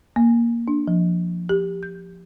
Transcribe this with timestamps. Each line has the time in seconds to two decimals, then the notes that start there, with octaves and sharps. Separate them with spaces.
0.16 A#3
0.68 D4
0.88 F3
1.49 G4
1.83 G6